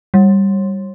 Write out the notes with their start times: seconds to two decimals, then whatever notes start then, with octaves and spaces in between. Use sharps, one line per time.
0.14 G3